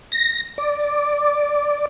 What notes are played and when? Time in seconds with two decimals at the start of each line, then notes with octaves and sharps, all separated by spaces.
0.12 A#6
0.58 D5